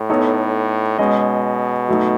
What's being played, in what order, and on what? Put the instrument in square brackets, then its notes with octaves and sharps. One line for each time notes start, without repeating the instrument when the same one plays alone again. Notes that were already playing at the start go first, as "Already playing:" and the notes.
Already playing: [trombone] A2
[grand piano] B3 D#4 A4 C#5
[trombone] B2 [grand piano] G#3 C#4 G#4 D#5
[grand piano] F#3 A3 D#4